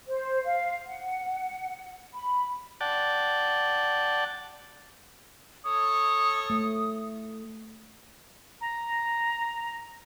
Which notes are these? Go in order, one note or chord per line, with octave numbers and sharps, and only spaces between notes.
C5
F5
F#5
B5
D5 F#5 G5 A5
A4 C#5 D#6
A3
A#5